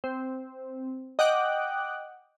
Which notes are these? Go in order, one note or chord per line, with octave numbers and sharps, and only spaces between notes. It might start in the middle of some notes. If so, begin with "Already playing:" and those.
C4
D#5 F#5 G5 D6 F#6